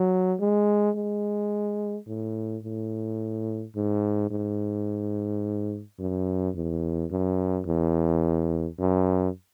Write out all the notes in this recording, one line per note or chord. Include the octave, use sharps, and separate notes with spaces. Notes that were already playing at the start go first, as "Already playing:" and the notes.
Already playing: F#3
G#3
G#3
A2
A2
G#2
G#2
F#2
E2
F#2
E2
F#2